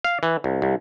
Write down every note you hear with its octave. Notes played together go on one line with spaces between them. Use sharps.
F5
E3
C2
C2